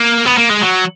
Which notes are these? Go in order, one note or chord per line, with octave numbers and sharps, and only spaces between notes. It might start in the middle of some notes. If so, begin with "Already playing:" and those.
Already playing: A#3
B3
A#3
G#3
F#3